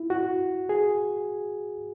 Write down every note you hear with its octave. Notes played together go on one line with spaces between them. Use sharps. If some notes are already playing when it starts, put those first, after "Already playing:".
Already playing: E4
F#4
G#4